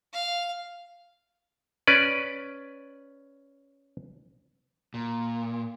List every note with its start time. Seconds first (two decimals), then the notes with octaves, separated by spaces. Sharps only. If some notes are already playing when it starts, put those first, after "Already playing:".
0.13 F5
1.87 C#4 B4 D5
4.94 A#2